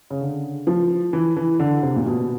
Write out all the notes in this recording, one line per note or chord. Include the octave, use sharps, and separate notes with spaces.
C#3
D3
F3
E3
E3
D3
C3
A#2
B2